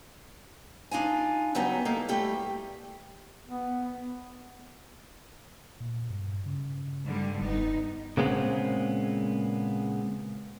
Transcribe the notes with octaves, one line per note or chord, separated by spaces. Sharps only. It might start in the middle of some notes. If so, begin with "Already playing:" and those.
D4 D#4 F4 G#5
C#3 F#3 G3 B3 D#4
A#3 D#4 A4
G3 A3 G4
B3
A#2
G2
C#3
G2 D3 G3
F1 B3 D#4
A#2 C#3 G#3 B3 C4